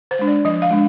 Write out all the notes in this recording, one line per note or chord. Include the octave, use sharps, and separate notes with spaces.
C5
G#3 D4
D5
F3 D#5
F5
G#3 D4